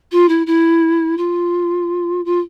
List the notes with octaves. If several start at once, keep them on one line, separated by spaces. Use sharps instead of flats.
F4
E4
E4
F4
F4